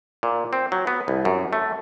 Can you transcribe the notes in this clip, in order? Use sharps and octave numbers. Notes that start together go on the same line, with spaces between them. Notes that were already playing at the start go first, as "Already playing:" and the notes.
A#2
C4
F#3
B3
C2
F#2
A3